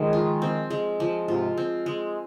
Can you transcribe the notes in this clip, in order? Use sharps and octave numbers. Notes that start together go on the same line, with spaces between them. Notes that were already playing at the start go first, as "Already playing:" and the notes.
Already playing: D#3 F3 G#3
F4
C4
G#3
F3
G#2 C3 F4
C4
G#3